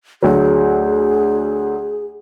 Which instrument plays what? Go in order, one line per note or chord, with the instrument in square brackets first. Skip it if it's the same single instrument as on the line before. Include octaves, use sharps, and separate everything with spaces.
[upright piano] D2 F#3 [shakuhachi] G#4